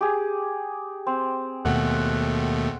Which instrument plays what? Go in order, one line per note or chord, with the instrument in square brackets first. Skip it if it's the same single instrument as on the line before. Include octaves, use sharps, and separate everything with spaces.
[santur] G4 G#4
C4
[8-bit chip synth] D#2 B2 A3 [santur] F#5